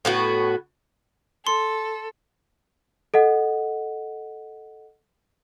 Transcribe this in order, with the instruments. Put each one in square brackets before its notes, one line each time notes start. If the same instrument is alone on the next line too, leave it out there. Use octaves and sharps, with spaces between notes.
[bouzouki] A2 B3 F#4
[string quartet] A4 [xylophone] C6
[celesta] A4 D#5 F#5